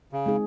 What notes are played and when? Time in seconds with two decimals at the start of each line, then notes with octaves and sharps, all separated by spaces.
0.13 C#3
0.26 G#3 C4 D#4 G#4